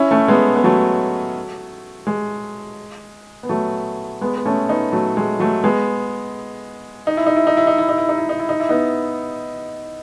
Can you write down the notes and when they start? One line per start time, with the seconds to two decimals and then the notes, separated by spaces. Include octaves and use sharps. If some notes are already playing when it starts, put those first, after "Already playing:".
Already playing: C#4 E4
0.11 A3 C#4
0.28 G#3 B3
0.56 B3
0.64 F#3 A3
2.07 G#3
3.43 B3
3.49 F#3 A3
4.21 G#3 B3
4.36 B3
4.46 A3 C#4
4.69 B3 D#4
4.92 F#3 A3
5.17 G#3
5.40 F#3 A3
5.64 G#3 B3
7.07 D#4
7.17 E4
7.26 D#4
7.37 E4
7.47 D#4
7.57 E4
7.67 D#4
7.78 E4
7.89 D#4
7.98 E4
8.09 D#4
8.18 E4
8.29 D#4
8.39 E4
8.49 D#4
8.60 E4
8.69 B3 D#4